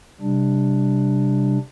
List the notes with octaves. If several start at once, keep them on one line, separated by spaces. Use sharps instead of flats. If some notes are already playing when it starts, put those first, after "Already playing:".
C3 G3 D4